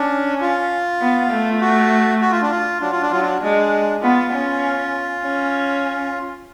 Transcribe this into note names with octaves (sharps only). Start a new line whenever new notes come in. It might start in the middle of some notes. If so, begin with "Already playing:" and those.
Already playing: C#4 D4
F4
B3
A3
F#4
F#4
F4
D4
F4
F#3 D4
F4
D4
F#3 F4
D4
G#3 D4
B3 F4
C#4
C#4